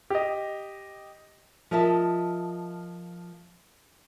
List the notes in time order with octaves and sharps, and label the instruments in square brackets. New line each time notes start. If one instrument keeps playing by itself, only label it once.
[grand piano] G4 D#5
[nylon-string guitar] F3 A#4 D#5 E5 A5